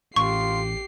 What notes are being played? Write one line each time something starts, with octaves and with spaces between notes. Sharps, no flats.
A1 F4 G4 C#6 C7